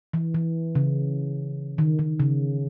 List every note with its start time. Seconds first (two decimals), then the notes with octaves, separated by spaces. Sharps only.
0.14 E3
0.34 E3
0.75 C#3
1.78 D#3
1.99 D#3
2.20 C#3